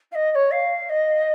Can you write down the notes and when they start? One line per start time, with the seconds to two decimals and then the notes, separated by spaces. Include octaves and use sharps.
0.11 F5
0.15 D#5
0.31 D#5
0.35 C#5
0.51 F5
0.89 D#5